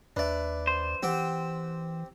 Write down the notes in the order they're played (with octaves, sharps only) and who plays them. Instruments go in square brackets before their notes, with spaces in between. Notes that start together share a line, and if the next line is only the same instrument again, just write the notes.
[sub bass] D#2 [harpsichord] D4 D5 [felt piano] B4 E5
[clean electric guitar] C5
[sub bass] E3 [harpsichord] C4 G4 G5 [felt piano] F#5